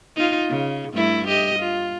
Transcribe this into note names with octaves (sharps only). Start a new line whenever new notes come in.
D#4 F4
C#3
G2 A3 E4
G4 D#5
F4